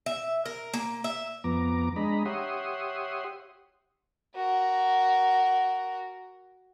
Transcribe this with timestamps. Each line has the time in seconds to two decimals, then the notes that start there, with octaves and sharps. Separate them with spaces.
0.06 E5
0.45 A#4
0.73 A#3
1.04 E5
1.44 F2 B3 A#5 D6
1.96 G#3 D4 D#5 A#5 B5
2.25 G4 C#5 E5 F#5 C6 D#6
4.35 F#4 A#4